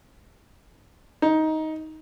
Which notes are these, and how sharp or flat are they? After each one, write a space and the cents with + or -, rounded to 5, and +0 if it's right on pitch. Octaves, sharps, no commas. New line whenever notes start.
D#4 +15